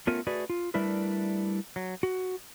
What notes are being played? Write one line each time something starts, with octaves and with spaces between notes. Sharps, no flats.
A3 B3 C#4 F4 A#4
A3 F#4 G#4 B4 D5
F4
G3 A3 D4 E4 A#4 B4
F#3
F#4